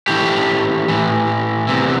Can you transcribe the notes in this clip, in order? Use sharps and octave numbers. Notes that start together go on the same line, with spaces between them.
A2 E3 G4
A2 E3
E2 C3 E3